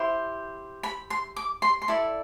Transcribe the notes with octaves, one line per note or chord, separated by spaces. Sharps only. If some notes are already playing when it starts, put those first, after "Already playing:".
Already playing: E4 G4 C5
B5
C6
D6
C6
C6
E4 A4 D5 B5